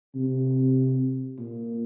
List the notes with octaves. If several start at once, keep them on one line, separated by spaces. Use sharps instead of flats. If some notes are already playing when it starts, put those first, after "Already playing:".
C3
A#2